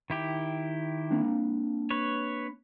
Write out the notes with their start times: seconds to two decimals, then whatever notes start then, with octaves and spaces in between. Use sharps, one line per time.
0.10 D#3 E4 G4
1.11 A#3 C4 D4
1.90 B4 C#5